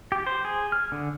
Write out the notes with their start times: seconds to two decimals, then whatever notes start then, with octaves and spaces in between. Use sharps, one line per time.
0.12 G4
0.27 C5
0.45 G#4
0.72 F6
0.92 D3